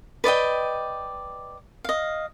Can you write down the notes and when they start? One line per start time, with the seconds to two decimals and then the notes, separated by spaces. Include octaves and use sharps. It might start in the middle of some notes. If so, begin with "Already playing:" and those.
0.24 B4 D5 D#5 G5
1.84 D#5 F5